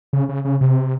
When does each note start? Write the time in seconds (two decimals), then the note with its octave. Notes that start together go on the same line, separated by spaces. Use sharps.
0.13 C#3
0.29 C#3
0.45 C#3
0.61 C3